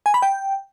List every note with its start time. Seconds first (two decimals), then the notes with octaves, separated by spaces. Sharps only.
0.06 G#5
0.14 B5
0.22 G5